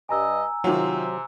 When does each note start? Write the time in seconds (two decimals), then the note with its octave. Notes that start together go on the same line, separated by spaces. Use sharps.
0.09 G2 D#5 G#5 A#5 E6
0.64 C3 D#3 F#3 F4